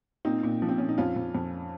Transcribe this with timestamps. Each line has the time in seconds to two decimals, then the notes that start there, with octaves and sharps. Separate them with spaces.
0.25 A#2 C4 D#4
0.43 A#2
0.62 F3
0.69 C4
0.78 A#2 C#4
0.89 D#4
0.98 F2 C#4 F4
1.16 F2
1.35 F2